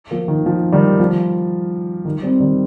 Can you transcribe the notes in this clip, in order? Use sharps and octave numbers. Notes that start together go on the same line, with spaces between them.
F3 A#3
D#3
F3
D#3 G3
F3
D#3 G3
G3 C4
D#3 G3